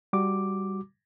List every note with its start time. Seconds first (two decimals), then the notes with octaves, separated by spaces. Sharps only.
0.13 G3 F#4 D6